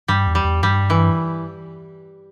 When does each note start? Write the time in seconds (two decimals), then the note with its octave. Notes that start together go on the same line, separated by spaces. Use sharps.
0.08 G2 G3
0.27 E2
0.35 G3
0.44 E2
0.62 G2 G3
0.90 E3